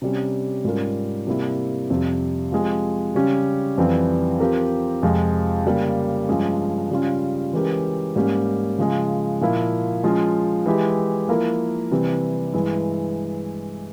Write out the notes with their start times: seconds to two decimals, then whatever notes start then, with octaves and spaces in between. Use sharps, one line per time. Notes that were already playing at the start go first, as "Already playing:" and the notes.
0.02 C3 G3 C#4
0.64 G#2 G3 C#4 F4 A#4
1.27 C3 G3 A#3 E4
1.90 F2 C3 G3 C4
2.52 F3 G#3 C4 G4
3.15 C#3 G3 C#4 G4
3.78 F2 E3 G3 C4
4.40 F3 C4 G4 A#4
5.03 F2 C3 F3 G#3
5.65 C#3 G3 A#3
6.28 G2 F3 G#3 C#4
6.90 C#3 G3 C#4 F4
7.53 E3 G#3 C#4 G4 A#4
8.16 G#2 G3 A#3 C#4 G4
8.78 C#3 F3 G#3
9.41 A#2 F3 A#3 E4
10.03 F3 G#3 C#4 F4
10.66 E3 G#3 E4 G4
11.29 F3 A#3 E4 A#4
11.91 C3 E3 G3 C4
12.54 G2 E3 G#3 E4